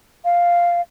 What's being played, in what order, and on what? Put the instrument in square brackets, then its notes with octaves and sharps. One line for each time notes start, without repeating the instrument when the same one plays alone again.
[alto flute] F5